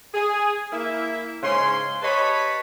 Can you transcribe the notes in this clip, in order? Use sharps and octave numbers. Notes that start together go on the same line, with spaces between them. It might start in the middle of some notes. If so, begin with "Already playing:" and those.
G#4
A#3 E4 E5
G#2 C#3 C#4 G#4 C6
G4 B4 C#5 D#5 A5 B5